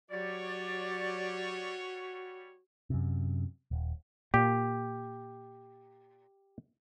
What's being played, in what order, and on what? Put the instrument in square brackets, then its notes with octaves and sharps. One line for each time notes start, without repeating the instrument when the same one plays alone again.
[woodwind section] F#3 G4 D5 [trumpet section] G3 C#5 [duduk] F#4
[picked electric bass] F#2 C3
D#1
[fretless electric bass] A#2 [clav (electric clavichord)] G4